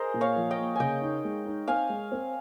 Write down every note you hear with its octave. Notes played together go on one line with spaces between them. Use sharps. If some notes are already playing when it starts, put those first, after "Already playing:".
Already playing: G#4 A#4 C5 D#5
A#2
C#5 F5
F3
D#5 G5
A#3
C#3 D#5 G5 G#5
D#4
G#3
D#4
C4 F5 G#5
G#3
C4